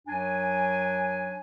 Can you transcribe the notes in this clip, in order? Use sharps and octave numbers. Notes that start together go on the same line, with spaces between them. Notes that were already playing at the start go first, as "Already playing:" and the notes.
F#2 F#3 D4 G#5